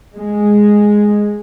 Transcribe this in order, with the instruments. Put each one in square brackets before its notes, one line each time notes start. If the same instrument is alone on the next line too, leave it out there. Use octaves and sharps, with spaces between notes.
[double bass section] G#3